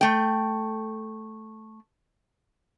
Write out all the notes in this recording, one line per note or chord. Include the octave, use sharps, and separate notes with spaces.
A3 G5